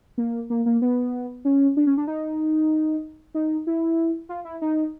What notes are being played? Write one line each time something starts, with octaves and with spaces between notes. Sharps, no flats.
A#3
A#3
A#3
B3
C#4
D4
C#4
D4
D#4
D#4
E4
F4
E4
D#4